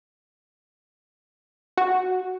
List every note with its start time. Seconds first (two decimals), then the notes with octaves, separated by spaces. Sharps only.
1.77 F#4